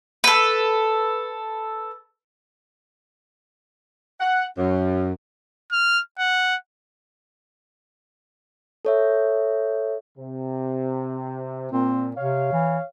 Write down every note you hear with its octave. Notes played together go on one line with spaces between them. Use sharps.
A4 B4
F#5
F#2
F6
F#5
A4 C#5 E5
C3
A#2 C4
C3 C#5 F5
E3